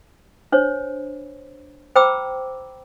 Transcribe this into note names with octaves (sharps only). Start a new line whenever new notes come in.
D4 C5 C#5
C5 G5 A#5 B5 D6 E6